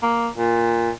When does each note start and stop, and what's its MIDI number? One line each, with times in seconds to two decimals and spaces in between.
0.03 0.28 58
0.36 0.90 46